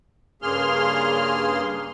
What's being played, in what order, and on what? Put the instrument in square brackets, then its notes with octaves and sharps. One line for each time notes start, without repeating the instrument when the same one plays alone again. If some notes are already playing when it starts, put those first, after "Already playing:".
[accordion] G2 C#3 A#3 G#4 C6 F6